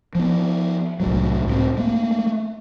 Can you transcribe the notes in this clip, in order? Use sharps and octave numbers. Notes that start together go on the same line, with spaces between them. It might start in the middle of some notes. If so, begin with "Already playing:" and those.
F3 B3
C2 A2 F#3
C#2 A2 G#3 C4
A3 A#3